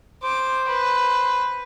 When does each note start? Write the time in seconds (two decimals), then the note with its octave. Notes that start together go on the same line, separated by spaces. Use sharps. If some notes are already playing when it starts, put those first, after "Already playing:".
0.23 C5 D6
0.68 B4